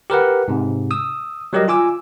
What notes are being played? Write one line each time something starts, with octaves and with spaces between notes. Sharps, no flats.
G4 A#4 B4 F#5
G#2 C3
D#6 E6
F#3 G3 G4 A#4 D#5
F4 G#5 D6 E6